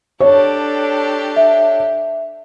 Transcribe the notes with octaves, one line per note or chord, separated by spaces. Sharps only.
D4 G4 A4 C#5
E5